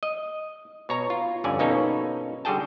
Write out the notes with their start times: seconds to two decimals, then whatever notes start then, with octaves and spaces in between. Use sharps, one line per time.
0.03 D#5
0.89 B2 C#5 A#5
1.10 F4
1.44 G1 F2 D3 C#4 D5 G#5
1.59 B2 A#3 C#4 D#4 A4
2.45 D3 G3 F#4 G#4 G5 A5